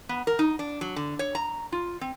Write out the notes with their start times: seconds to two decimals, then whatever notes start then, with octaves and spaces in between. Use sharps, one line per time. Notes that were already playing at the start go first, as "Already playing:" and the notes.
0.09 B3
0.27 A#4
0.39 D#4
0.59 D4
0.81 F#3
0.96 D3
1.19 C#5
1.35 A#5
1.72 F4
2.01 C4